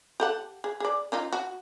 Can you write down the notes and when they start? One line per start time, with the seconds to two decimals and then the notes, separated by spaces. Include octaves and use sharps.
0.20 G4 A4 F#5
0.64 G#4
0.80 G#4 D5
1.12 C#4 D#4 F4
1.33 F#4